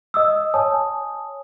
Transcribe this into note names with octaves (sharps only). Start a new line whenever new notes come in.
D#5 D#6 E6
C#5 G#5 A5 D#6